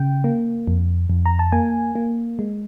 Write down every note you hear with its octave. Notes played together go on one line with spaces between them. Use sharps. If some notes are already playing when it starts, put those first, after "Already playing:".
Already playing: C#3 G5
A#3
F2
F2
A#5
A5
A#3 G#5
A#3
G#3